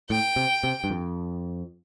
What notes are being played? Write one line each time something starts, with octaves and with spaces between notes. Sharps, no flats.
A2 G5
C3
C3
G2
F2